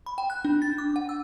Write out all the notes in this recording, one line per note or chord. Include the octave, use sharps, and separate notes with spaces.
B5
G5
F#6
D4
A6
D6
F#5
E6